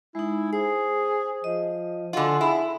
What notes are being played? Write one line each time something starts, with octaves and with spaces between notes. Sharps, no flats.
G#3 D#4 E4
G#4 C5 D#6
F3 D#5
D3 F4 F#4 F#5 G#5
E4 G#4